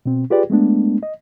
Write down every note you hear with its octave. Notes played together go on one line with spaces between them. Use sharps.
B2 C4
F4 G4 G#4 B4 D5 G5
G#3 A3 B3 D4
D#5